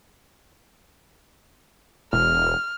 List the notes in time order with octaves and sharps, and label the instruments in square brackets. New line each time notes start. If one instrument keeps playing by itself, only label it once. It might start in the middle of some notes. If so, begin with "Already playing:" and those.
[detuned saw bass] E1 [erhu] F6